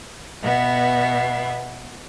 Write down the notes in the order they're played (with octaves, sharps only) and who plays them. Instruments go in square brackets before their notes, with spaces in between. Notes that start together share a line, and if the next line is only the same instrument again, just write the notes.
[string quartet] B2 B3 E5